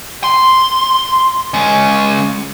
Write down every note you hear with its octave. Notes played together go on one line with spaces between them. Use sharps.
C6
G#3 C#4